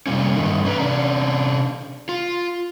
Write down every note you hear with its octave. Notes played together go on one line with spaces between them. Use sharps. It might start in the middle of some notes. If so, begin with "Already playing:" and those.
C3 G3 A#3 C#4
G2 D3 D#3
C#4 D4 B4 A#5
C3 C#4 D4
F4